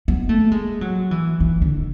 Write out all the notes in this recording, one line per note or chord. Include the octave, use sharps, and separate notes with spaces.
B3
A3
G#3
F#3
E3
E3
D3